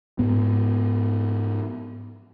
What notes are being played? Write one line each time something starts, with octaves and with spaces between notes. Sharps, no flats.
G#2 B3